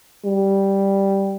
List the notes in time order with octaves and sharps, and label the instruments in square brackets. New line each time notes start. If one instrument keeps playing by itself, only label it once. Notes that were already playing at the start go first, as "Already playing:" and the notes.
[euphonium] G3